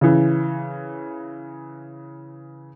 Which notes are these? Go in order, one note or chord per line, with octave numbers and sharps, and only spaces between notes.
C#3 E3